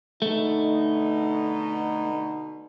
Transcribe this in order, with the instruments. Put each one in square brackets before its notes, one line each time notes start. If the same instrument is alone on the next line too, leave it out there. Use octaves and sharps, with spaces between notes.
[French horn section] B2 D3 D#4 [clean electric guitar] A3